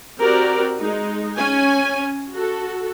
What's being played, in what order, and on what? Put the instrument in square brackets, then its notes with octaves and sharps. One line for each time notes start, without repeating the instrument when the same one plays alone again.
[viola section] C4 F#4 G4 A#4 D5
G#3 D#4
C#4 G#5
F#4 A4